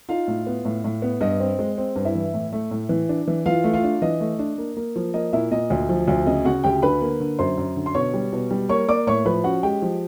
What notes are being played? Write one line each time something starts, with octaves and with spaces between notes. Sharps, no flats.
D#4 F4 F5
A2
B3
A2
A2
B3
G2 D#5
C4
G#3
C4
G2
E4 E5
E3
A2
A3
A2
E3
D4
E3
E3 F4 F5
A3
F4 F5
D4
E3 D#5
A3
D4
A#3
A#3
F3
A#3 D#5
A#2 E4 E5
A#2 D#5
D2
F3
D2
C#3 D#5
C#3 F#4 F#5
D2 G4 G5
D3 B4 B5
A#3
D3
F#2 C5 C6
F#2
D3
C6
B2 C#5 C#6
G3
B2
G3
A#3 C#5 C#6
A#3 D5 D6
A2 C#5 C#6
F3 B4 B5
C#4 F#4 F#5
G#3 G4 G5
F3